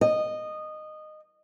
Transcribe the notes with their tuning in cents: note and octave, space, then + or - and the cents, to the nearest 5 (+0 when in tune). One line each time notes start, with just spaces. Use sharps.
D#5 -15